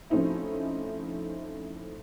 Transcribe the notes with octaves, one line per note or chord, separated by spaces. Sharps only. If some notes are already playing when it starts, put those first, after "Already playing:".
F3 A3 C4 C#4 D#4 E4